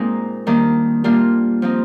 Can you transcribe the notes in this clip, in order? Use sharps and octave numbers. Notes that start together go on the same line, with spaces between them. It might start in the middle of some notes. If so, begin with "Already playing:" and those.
Already playing: A#2 G#3 A#3 C4 D#4
D#3 G3 A#3 D4
G3 A#3 D4 F4
F3 C4 D#4